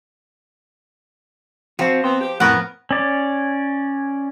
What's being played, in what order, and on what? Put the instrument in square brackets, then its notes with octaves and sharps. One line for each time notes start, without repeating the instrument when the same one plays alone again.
[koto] F3 [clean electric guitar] C4 F#4
[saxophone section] B3 C4 [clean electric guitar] C5
[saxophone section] G4
[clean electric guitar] F2 A2 [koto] B3 A#4 [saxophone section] F#5
[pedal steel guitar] C#4 D5